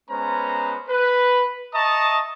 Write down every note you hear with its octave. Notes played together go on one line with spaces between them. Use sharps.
G#3 B3 C#4 B4 C5 A#5
B4
D#5 E5 A5 A#5 C#6 D#6